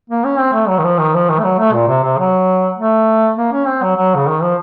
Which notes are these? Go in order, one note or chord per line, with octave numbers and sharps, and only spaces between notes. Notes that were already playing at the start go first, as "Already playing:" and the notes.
A#3
C#4
C4
A3
F#3
D#3
F3
D#3
F3
D#3
A3
F#3
A3
A#2
C3
C3
F#3
A3
A#3
C#4
C4
F#3
F#3
C#3
D#3
F3